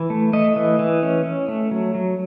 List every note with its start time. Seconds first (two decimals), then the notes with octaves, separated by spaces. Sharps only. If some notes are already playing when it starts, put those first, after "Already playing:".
Already playing: E3
0.10 A3
0.33 A3 D#5
0.56 E3
0.79 E3
1.03 C#4
1.25 C#4
1.48 A3
1.71 F#3
1.95 F#3